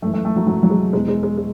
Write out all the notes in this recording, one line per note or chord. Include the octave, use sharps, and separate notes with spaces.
F#2 E3 A3
A3
A3
F#3
F#2 E3 F#3
F#3
G#3
E2 B2 G#3
G#3
G#3
G#3